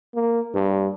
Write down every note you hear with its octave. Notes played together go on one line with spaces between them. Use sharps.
A#3
G2